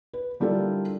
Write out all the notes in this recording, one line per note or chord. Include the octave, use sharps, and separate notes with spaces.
B4
D3 G3 E4 F4 A4 A#4